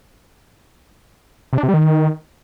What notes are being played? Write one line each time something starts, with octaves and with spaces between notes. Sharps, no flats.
C3
D4
C3
G3
D#3